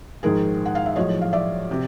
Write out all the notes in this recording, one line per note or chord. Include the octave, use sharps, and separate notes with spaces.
A#1 G#2 D#3 G#4 A#4
F#5
F5
E5
B1 A2 F3 G#3 C#5 D#5
F5
D5 E5
C3